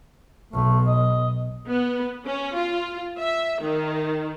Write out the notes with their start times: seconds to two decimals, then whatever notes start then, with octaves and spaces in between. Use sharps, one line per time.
0.53 B1 A3
0.86 D#5
1.68 B3
2.26 C#4
2.56 F4
3.19 E5
3.61 D#3